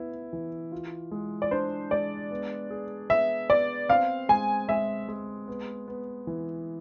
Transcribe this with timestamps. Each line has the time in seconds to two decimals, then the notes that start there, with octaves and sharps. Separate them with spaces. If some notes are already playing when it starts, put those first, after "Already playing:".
Already playing: B3 E4
0.33 E3
0.72 F4
1.11 G#3
1.42 D5
1.51 D4 C5
1.91 G#3 D5
2.31 B3
2.70 G#4
3.10 B3 E5
3.49 B3 D5
3.89 C4 F5
4.29 G#3 G#5
4.68 G#3 E5
5.08 G#3
5.48 B3
5.88 B3
6.27 E3